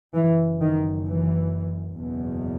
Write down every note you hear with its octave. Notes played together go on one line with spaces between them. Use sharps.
F#1 F#2 E3
D#3
E3
F#1 E2 B2